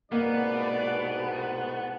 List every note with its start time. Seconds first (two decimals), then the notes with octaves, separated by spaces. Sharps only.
0.12 C2 G#2 B2 A#3 B3 D5